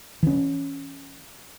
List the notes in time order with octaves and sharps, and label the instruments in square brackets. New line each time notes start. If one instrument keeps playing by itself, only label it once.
[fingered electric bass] E3 C#4